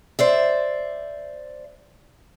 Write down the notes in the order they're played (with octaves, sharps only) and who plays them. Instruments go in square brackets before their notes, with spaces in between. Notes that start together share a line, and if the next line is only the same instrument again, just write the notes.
[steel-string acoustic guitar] C5 D5 E5